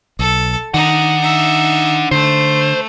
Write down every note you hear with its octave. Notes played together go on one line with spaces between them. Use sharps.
B1 A4
D#3 D4 D#4 F#5
D#4 E5
D3 A3 C5